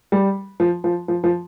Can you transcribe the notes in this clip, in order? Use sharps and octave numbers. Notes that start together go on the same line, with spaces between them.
G3
F3
F3
F3
F3